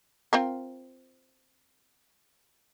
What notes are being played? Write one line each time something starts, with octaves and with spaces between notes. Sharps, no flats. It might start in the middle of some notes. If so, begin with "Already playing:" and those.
C4 F4 A#4